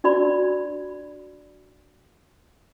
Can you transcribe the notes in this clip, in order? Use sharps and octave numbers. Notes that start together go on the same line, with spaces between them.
D4 F#4 D5 B5